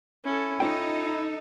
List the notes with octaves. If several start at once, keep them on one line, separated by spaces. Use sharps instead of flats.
C#4 E4 A4
D#4 F4 A4 C#5 G5